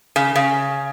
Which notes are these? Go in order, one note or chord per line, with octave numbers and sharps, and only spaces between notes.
C#3
C#3